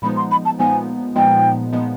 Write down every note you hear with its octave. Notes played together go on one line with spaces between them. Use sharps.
A#2 F3 G#3 B3 D#4 B5
C6
B5
A5
A#2 F3 G#3 B3 D#4 G#5
A#2 F3 G#3 B3 D#4 G5
A#2 F3 G#3 B3 D#4